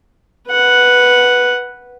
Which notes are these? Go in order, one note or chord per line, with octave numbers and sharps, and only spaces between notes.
B4 F#5